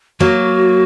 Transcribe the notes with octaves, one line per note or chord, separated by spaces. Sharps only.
F#3 A#3 F#4